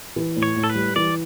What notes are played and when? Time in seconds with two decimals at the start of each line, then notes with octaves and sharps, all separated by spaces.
0.16 E3
0.36 A2
0.43 C#5
0.56 A2
0.64 A4
0.70 B4
0.75 G3
0.96 E3 D5